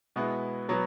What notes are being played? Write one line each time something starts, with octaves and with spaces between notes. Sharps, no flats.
B2 G#3 B3 E4
B2 F#3 B3